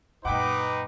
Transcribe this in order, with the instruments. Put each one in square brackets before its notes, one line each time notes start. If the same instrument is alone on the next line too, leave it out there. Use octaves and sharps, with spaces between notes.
[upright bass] F#2 A#2 [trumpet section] D#4 B4 [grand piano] F#5 G5 [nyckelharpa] D6